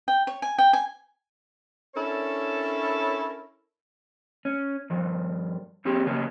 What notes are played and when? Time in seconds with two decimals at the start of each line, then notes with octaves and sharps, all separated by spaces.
0.08 G5
0.27 C#5
0.42 G#5
0.58 G5
0.73 G#5
1.95 C#4 D4 E4 A4 A#4 C#5
4.45 C#4
4.90 G2 F3
5.85 F2 C4 G4 G#4
6.06 C#3 F#3 A#3 B3 C#4